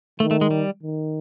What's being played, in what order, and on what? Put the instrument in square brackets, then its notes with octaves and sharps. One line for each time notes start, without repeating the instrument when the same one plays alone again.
[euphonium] D#3 [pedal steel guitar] A3
[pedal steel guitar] A3
G#3
G3
[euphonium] D#3